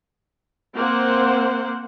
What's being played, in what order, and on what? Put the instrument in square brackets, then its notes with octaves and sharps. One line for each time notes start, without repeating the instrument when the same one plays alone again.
[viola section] A#3 C4 C5 F#5